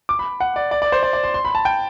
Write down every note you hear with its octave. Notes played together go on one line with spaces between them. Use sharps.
D6
B5
F#5
D5
D5
D5
C5
D5
D5
C6
C6
B5
A5
G5